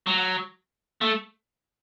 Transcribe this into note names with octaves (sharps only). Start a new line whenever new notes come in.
F#3
A3